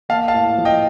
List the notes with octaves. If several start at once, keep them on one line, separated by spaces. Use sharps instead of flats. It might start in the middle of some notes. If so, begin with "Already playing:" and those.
A#3 F5 A5
F5 A5
A2
F3
D#5 G5